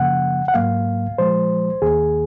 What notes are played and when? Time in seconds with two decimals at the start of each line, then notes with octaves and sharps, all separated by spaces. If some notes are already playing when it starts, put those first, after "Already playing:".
Already playing: F#2 C#3 F3 A#3 F#5
0.48 F#5
0.54 G#2 F#3 A#3 F5
1.18 A#2 F3 G#3 C5
1.82 D#2 D#3 A#3 G#4